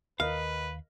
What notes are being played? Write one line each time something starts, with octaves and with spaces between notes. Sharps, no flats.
D#2 A#4 B4 D#5 F5